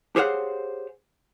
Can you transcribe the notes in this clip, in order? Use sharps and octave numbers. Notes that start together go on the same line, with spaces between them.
G4 G#4 C5 C#5 F5 F#5